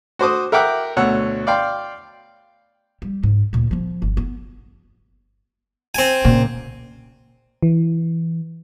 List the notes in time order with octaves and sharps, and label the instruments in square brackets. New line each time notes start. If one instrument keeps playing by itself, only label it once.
[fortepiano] F#4 C5 D6 D#6
A#4 E5 F#5 G5 D6 F#6
D2 B2 C#5 F#5 E6
D5 F5 G5 C6
[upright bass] G3
G#2
D2 A#2
F3 B3
G1
B3
[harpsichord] C4 G#5
[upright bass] A#2 C#3
[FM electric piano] E3